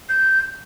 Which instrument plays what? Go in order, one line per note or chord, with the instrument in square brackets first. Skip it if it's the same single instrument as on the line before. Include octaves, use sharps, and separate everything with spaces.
[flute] G6